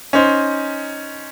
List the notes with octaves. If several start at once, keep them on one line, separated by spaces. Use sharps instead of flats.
C#4 D#4 C5